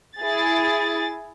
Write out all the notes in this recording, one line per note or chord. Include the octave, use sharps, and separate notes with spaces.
E4 G#4 A6